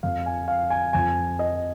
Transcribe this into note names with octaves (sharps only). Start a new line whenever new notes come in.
F2 F3 F5
G#5
F5
G#5
F2 F3 G#5
D#5